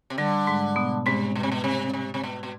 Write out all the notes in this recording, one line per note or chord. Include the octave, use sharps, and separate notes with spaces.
C3
D3 G3
G#2 G#3
B2 B3
G#2 C3 G#3
B2
C3
B2
C3
C3
C3
B2
B2